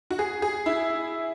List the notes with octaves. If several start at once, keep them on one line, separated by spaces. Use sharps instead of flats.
F#4
G#4
G#4
E4